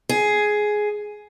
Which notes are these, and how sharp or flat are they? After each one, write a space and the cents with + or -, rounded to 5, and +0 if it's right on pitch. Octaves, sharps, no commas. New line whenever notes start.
G#4 +10